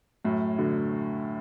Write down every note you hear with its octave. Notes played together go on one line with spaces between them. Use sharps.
F#2 A2
B2 D3